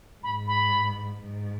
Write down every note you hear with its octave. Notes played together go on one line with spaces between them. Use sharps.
G#2 B5
B5
G#2